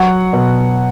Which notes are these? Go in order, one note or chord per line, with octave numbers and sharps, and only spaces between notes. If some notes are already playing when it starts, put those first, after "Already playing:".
Already playing: F#3 F#5
B2